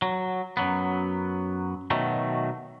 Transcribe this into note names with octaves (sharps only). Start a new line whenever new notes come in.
F#3
F#2 F#3 B3
B2 D#3 F#3 A3